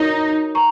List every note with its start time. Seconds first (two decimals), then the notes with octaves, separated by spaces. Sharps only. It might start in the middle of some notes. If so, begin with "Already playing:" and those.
Already playing: D#4 F#4 A#4 C#5
0.55 A#5 C#6